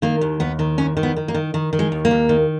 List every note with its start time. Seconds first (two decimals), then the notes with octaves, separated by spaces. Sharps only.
0.02 D#3 A#3
0.21 D#2
0.40 D#2 B3
0.59 D#3
0.78 D#2 C#4
0.97 D#3
1.03 B3
1.16 D#3
1.28 A#3
1.34 D#3
1.54 D#3
1.73 D#3
1.79 G#3
1.92 D#2
2.05 A#3
2.11 D#2
2.29 D#3